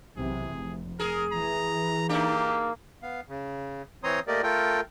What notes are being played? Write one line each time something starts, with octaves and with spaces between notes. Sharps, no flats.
B1 C3 E3 G#4
F1
G#4 A#4
E3 A#5
A#3 D4 D#4 G4
B3 F5
C#3
E3 C4 C#5 A#5 C6 D#6
A3 A#3 G4 A#4 D5 D#5
A3 F4 A4 A#4 G5